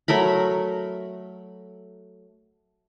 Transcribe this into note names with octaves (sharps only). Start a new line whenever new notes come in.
F#3 A3 A#4 B5